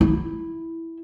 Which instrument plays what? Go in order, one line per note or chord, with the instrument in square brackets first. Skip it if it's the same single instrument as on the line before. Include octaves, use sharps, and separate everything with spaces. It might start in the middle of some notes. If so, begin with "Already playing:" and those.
[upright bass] E4